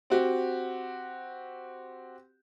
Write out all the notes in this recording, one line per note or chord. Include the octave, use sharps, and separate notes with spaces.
C4 F#4 G4